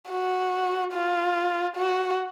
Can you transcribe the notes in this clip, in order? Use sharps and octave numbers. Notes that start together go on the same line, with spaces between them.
F#4
F4
F#4